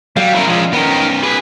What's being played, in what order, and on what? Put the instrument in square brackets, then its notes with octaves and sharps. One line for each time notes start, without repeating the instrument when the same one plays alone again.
[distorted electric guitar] F#3 [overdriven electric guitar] G3 [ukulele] F5
[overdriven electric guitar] A3 A#4 [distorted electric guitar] C#4 E4
[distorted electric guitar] F3 D4 [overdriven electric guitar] G#3 C#4
[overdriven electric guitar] D#3 A#4 [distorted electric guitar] B3 C#4
[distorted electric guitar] G4 G#5 [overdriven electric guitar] B4